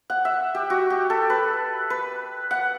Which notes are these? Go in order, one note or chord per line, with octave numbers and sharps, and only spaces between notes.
F#5
E5
G4
F#4
G4
A4
B4
B4
F#5